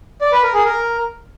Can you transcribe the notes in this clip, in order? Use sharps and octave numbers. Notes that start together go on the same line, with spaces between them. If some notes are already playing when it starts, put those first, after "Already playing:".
D5
B4
A#4
G#4
A#4